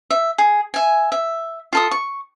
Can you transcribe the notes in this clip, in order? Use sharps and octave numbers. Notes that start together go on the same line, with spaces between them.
E5
G#4
E5 G#5
E5
F4 A4 D#6
C#6